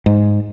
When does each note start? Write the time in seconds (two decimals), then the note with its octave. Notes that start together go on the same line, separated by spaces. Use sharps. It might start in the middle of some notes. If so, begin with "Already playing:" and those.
0.06 G#2